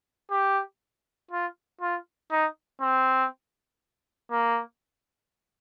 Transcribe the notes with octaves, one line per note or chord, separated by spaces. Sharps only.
G4
F4
F4
D#4
C4
A#3